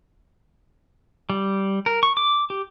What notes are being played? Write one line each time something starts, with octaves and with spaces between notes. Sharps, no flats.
G3
A#4
C#6
D6
G4